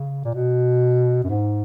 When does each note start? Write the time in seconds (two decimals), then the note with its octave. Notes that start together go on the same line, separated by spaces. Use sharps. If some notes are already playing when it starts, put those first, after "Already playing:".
Already playing: C#3
0.25 A#2
0.35 B2
1.24 F#2
1.30 G#2